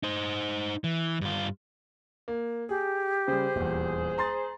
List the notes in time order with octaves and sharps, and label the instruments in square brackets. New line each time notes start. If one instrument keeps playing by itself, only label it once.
[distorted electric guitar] D#4 C5
E3
G2 F4
[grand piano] A#3
[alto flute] G4 [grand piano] G#4
[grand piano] C#3 G3 [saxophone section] G#4 C5
[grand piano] D#1 E2
A#5 C6 A6